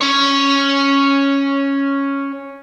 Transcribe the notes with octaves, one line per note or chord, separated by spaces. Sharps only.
C#4 C#5